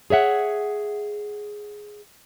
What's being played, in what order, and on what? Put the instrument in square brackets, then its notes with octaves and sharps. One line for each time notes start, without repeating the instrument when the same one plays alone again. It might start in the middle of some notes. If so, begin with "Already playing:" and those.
[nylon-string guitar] G#4 C#5 E5 F#5